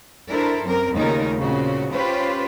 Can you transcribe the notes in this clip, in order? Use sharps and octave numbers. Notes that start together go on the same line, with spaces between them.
D4 E4 A4 A#4 C5
F#2 C4 A#4
D#2 A#2 C#3 A3 D#4 A#4
A#2 C#3 C4 F#4
C#4 F4 G4 B4 C5